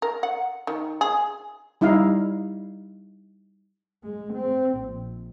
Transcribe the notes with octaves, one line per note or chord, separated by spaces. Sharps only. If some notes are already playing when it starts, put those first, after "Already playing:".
A#4
F#5
D#3
G#4
G3 D#4 E4 F5
G#3
C4
A#1